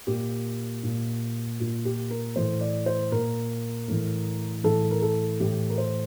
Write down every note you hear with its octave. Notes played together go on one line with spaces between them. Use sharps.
A#2 G4
A#2
A#2 F4
G4
A#4
A2 E3 C5
D5
C5
A#2 A#4
A2 E3
A2 E3 A4
A#4
A4
A2 E3 G4
A#4
C5